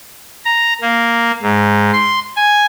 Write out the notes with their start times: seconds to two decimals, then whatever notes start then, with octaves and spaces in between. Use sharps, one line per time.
0.45 A#5
0.81 A#3
1.42 G#2
1.93 C6
2.36 G#5